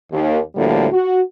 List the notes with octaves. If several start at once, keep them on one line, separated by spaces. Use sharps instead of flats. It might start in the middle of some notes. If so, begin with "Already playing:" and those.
D#2
D2 A2 D3 F3 G3 A#3
F#4